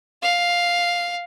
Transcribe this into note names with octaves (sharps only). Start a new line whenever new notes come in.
F5